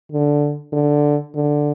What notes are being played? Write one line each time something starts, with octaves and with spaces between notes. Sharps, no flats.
D3
D3
D3